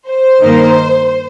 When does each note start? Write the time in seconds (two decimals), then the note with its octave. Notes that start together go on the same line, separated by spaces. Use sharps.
0.09 C5
0.42 G2 D#3 A#3 D#4